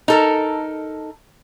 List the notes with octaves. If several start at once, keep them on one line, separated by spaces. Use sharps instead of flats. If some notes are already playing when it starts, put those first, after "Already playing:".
D#4 A4 A#4